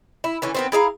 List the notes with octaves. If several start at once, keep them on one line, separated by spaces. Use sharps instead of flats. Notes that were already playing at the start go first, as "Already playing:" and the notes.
E4
D3 E3 C#4
D#3 B3 C4
E4 G#4 F5 A#5